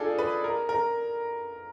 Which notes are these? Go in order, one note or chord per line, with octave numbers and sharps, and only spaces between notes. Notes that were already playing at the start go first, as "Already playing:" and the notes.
Already playing: D4 D#4 F4 G#4 A4
B4
A#4
A#4